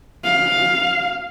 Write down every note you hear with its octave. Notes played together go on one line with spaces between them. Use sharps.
F5